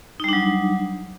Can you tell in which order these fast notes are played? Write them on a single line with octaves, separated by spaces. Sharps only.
D#4 G3 D4 F#3